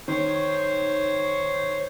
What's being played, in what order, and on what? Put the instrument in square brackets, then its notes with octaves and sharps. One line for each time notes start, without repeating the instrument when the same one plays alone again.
[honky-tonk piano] D#3 [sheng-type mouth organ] C5 C#5